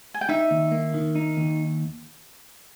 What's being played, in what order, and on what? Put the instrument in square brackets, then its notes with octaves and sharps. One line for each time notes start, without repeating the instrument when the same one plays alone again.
[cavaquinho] G#5
G5
[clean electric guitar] D#4 [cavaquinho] E5
[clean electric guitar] D#2
A#3
D#3
D#4
D#2